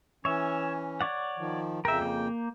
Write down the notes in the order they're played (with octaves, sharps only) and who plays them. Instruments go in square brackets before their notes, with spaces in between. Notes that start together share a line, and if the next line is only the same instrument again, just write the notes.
[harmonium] E3 C#4 [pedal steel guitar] C#5 E5
[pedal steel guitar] C#5 D5 F#5
[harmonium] D#3 F3
[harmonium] F2 C#3 G5 [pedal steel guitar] A#4 E5
[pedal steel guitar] A#3 G6